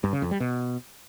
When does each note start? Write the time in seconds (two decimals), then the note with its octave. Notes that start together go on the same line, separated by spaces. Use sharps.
0.04 G2
0.13 C#3
0.22 F2
0.31 G3
0.40 B2